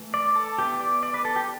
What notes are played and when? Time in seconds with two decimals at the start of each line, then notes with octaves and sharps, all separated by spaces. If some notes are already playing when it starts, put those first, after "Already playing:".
Already playing: E3 A3
0.14 D5
0.36 A4
0.59 E3 B3 G4
0.80 D5
1.03 D5
1.14 B4
1.25 A4
1.36 G4